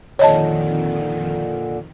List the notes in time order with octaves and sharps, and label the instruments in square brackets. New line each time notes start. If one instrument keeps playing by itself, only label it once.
[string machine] F2 D#3 [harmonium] A#2 D3 [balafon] C#5 D#5 A5